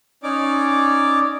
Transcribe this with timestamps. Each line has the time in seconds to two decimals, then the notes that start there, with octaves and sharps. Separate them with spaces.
0.23 C#4 D#4 D5 D6